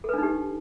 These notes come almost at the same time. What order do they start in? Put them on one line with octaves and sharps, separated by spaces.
A4 B4 D4 D#4 G4